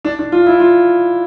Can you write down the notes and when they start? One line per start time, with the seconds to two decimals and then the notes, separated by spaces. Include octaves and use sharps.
0.05 D4
0.19 D4
0.32 F4
0.46 E4
0.60 F4